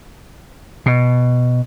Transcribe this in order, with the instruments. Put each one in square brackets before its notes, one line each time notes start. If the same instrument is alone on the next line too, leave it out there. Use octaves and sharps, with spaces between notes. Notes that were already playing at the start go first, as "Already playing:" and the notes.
[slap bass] B2